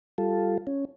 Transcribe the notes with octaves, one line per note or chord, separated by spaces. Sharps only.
G3 F4 A4
C#4